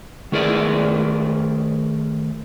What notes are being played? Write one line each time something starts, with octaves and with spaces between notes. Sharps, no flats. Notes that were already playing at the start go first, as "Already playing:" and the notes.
D#3 A3 G#4 A#4 B4 D5